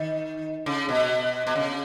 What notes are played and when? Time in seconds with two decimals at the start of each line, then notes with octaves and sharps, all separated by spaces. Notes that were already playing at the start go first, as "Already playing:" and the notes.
Already playing: D#3
0.66 C#3
0.89 B2
1.47 B2
1.56 C#3